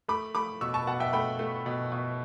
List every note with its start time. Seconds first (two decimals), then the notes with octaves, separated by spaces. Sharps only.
0.08 A3 B5 D6
0.35 A3 B5 D6
0.61 B2 C#6 E6
0.74 A5 C#6
0.87 B2 F#5 A5
1.00 E5 G5
1.13 A3 G5 B5
1.39 A3
1.66 B2
1.92 B2